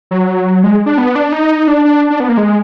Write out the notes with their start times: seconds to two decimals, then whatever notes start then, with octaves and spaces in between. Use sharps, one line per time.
0.11 F#3
0.64 G#3
0.86 D4
0.98 B3
1.15 D4
1.32 D#4
1.68 D4
1.85 D4
2.10 D4
2.20 B3
2.29 A#3
2.37 G#3